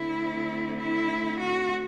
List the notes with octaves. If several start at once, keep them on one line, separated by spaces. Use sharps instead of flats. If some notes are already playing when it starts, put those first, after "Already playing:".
Already playing: D3 A3 C4 E4
E4
F#4